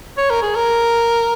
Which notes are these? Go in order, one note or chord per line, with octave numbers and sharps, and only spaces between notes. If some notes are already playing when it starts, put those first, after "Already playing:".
C#5
A#4
G#4
A#4